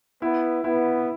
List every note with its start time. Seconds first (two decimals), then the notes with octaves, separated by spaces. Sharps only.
0.22 B3 E4
0.64 B3 E4